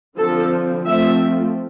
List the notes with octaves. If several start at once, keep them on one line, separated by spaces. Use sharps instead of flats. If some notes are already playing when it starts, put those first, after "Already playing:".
D3 F3 C4 A4
F3 A3 C4 E5